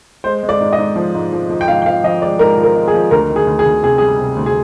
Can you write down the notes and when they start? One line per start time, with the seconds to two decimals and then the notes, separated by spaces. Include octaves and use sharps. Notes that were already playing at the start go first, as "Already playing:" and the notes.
0.24 G#3 C5
0.43 G#3
0.49 D5
0.60 G#2
0.73 D#5
0.78 G#2
0.96 F3
1.15 G#2
1.33 F3
1.50 F3
1.61 G5
1.68 G#2 F5
1.82 G5
1.86 F3 F5
2.04 F3 D#5
2.21 G#3 D5
2.39 G#2 A#4
2.58 F3
2.64 A#4
2.75 G#3
2.88 G#4
2.94 F3
3.11 D2 A#4
3.29 D#3
3.36 G#4
3.47 D2
3.59 G#4
3.66 D2
3.83 C3 G#4
3.98 G3 G#4
4.19 C3
4.36 D2
4.46 G#4